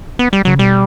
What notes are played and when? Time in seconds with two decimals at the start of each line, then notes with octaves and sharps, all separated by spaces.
0.19 B3
0.33 G3
0.45 C#3 F#3
0.59 B2 G3